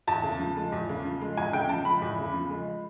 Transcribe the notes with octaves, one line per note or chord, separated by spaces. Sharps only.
E2 A5
C#3
F3
G#3
E2
C#3
F3
G#3
E2 G#5
C#3 G5
F3 A5
G#3 B5
E2
C#3
F3
G#3